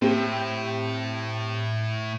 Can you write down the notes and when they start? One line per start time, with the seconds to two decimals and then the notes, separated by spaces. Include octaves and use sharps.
0.02 A2 C4 G4